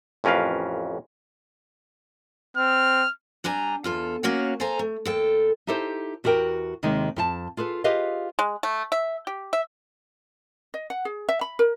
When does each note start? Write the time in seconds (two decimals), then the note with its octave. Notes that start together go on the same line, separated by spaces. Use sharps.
0.24 A1 F2 C#4 A#4 B4 F5
2.57 C4 F6
3.44 G3 D4 G#5 A#5
3.84 E2 F4 A4
4.23 A#3 C#4 F#4 C#5 F5
4.60 A4 C5 F5 G#5 A#5
4.79 A3
5.05 D#2 A4 G5
5.67 D#4 E4 G4 A4 C5
6.24 E2 F#4 G4 A#4 G5
6.83 D#2 C3 D#3 G#3 D#4
7.16 F2 G4 A5
7.57 F4 G#4 A4 B4
7.84 F4 G4 G#4 B4 D#5 F5
8.39 G#3
8.63 A3
8.92 E5
9.27 G4
9.53 E5
10.74 D#5
10.90 F#5
11.05 G#4
11.29 E5
11.41 B5
11.59 A#4